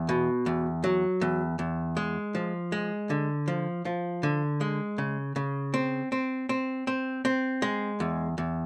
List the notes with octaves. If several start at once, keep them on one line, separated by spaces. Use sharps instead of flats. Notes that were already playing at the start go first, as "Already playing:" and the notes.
Already playing: E2
B2
E2
F#3
E2
E2
G#3
F3
G#3
D3
F3
F3
D3
G#3
C#3
C#3
C4
C4
C4
C4
C4
G#3
E2
E2